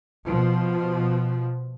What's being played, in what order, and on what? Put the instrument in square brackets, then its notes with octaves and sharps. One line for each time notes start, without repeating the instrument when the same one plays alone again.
[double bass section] B2 F3